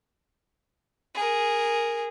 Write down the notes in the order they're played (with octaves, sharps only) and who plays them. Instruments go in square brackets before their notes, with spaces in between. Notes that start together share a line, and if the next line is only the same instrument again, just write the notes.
[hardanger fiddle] G#4 A#4